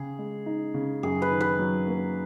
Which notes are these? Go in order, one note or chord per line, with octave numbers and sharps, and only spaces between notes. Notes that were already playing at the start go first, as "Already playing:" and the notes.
Already playing: C#3 G#4
G#3
D#4
C#3
F#2 G#4
B4
D#3
B4
F#3
A#3